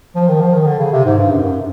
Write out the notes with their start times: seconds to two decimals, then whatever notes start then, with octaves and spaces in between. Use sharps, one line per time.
0.15 F3
0.28 D#3
0.41 F3
0.54 D#3
0.66 D3
0.79 C#3
0.92 C3
1.05 G#2
1.18 G2
1.30 F#2
1.43 F#2